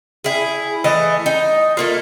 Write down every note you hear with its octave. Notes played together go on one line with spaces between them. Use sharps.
E4 G#4
E3 A3 D#5
D#4
A3 A#3 F4